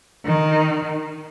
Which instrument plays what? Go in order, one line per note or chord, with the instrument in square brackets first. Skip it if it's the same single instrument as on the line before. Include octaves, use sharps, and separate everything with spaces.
[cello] D#3